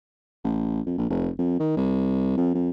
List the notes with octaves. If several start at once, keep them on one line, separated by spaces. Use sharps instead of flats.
A1
F2
A#1
F1
F2
D#3
C2
F2
F2